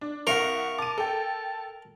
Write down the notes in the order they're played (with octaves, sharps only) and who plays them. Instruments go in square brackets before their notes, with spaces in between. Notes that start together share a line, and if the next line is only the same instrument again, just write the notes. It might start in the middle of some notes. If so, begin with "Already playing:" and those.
[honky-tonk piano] D4
[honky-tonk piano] C2 F5 F#5 [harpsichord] A#4 [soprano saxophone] C#6
[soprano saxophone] A5 [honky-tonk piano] D6 D#7
[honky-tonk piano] A4 G5